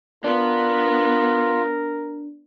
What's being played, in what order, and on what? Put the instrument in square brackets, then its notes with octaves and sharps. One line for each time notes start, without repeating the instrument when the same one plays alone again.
[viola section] B3 [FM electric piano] D4 [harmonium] F4 [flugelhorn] A#4